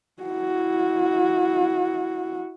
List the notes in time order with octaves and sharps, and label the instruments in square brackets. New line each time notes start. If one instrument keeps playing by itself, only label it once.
[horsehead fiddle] E4 F#4